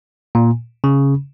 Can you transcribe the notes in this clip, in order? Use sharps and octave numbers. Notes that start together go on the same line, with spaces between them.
A#2
C#3